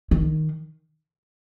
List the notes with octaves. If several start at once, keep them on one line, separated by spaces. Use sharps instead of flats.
D#3